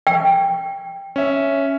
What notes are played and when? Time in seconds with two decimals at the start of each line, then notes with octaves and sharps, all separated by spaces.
0.07 G5
1.16 C#4 E5